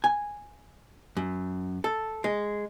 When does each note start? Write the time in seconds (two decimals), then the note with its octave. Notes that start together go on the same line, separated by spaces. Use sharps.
0.04 G#5
1.17 F#2
1.84 A4
2.24 G#3